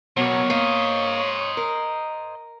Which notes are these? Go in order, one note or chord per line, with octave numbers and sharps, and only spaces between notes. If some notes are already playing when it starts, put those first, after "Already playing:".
B2 F#3 A#3 C#5
A#3 C5 D#5
A#4